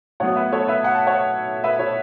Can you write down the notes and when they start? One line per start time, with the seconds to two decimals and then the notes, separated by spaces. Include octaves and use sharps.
0.20 A2 F#3 B3 C#5 F#5
0.36 B4 E5
0.52 A4 C#5
0.68 B4 E5
0.84 F#5
0.95 A5
1.07 C#5 F#5
1.64 B4 E5
1.79 A4 C#5